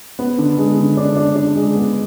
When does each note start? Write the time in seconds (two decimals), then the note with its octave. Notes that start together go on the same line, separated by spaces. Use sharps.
0.19 B3
0.38 D3
0.58 G#3
0.77 D3
0.97 D4
1.16 D4
1.35 D4
1.56 G#3
1.75 B3